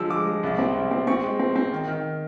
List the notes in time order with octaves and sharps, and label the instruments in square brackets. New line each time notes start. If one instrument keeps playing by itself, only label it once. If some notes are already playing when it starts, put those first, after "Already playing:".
Already playing: [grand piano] D3 F3 G#3 E6
G#3 D6
G#3
C2
C4
C2
C4
C4 C#6
G#3
C4
C4
D#3
D#3